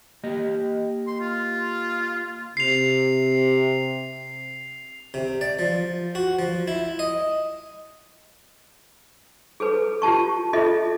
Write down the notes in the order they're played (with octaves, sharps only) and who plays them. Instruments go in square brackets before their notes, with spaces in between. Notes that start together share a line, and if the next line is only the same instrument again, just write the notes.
[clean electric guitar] A#3 G4 D#5
[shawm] C6
F4
[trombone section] C3 [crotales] C7 F7
[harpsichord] C3
D5
F3
F#4
F3
E4
D#5
[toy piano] G#4 A4 B4
F4 G4 A5 C#6
F4 G#4 A4 D#5 E5